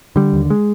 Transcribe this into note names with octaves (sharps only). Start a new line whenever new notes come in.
D3 G3
D#2
G#3